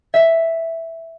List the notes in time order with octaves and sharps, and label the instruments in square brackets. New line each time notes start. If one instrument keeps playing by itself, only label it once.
[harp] E5